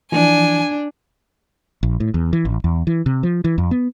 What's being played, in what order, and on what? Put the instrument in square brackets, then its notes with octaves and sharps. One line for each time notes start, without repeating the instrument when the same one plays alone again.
[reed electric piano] E3 F3 [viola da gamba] D4 [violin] G#5
[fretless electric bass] A#1
A2
E2
E3
A1
E2
E3
C3
F3
E3
F2
B3